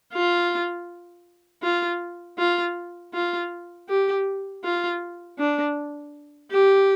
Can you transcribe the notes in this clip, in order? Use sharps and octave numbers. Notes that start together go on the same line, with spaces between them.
F4
F4
F4
F4
G4
F4
D4
G4